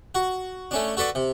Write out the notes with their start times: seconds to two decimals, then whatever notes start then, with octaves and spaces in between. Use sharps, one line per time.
0.15 F#4
0.71 A3 C#4 D4
0.97 F#4 A4 B4 D5
1.15 C3